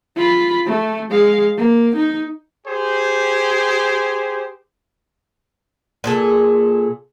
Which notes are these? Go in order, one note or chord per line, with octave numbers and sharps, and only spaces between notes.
F4 B5
A3
G#3 F5
A#3
D#4
G4 G#4 C5
A#2 G#4 A4